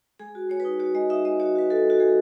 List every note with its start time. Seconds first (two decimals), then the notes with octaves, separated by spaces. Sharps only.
0.19 G#3 G#4
0.35 F#4
0.50 G#3 C#5
0.60 D#4 B4
0.80 F#4 C#5
0.95 G#3 D#5
1.10 D#4 E5
1.25 G#3 D#5
1.40 F#4 C#5
1.55 F#4 B4
1.70 F#4 A4
1.85 G#3 F#4
2.00 G#3 G#4